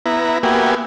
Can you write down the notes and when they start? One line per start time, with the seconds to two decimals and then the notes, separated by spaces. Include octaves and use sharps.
0.06 B3 E4 A#5
0.43 A#3 B3 F#4 G4 E5 G#5